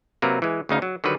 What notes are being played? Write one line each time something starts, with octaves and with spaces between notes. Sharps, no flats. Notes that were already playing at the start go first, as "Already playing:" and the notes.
C3 F#3 A#3 A#4 B4
E3 G#3
D2 C#3 D#4 F5
F#3
D3 D#3 F#3 G3 B4